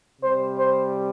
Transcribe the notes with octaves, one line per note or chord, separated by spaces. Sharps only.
C3 G3 C5
C5